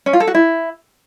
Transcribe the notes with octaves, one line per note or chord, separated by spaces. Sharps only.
C#4
F4
A4
F#4
E4